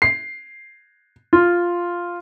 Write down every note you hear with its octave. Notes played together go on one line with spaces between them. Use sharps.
C7
F4